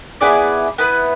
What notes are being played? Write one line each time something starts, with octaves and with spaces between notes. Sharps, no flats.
B3 E4 G#4 D5
B3 E4 B4